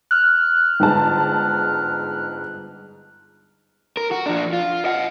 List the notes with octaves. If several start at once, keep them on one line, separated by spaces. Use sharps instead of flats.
F6 F#6
G1 G#2 A5
A#4
F#4
F3 D4
F4
D#5 F#5